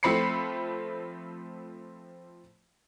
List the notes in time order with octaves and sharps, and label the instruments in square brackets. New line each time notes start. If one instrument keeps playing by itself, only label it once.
[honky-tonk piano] F3 A3 C4 B5 C7 C#7